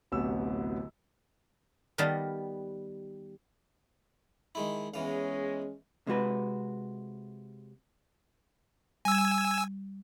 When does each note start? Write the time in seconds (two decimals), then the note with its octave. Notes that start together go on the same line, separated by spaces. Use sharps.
0.12 D1 A1 D2 C3 B3 E6
1.98 D#3 G3 B3 D#5 F5 A5
4.55 D#3 G#3 E4
4.94 E2 E3 G#3 C#4 F5
6.07 C3 G#3 F#4 B4
9.05 G3 G#5 E6